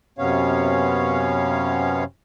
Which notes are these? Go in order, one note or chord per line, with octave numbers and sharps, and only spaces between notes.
F#2 C3 B3 C#4 C#5 F5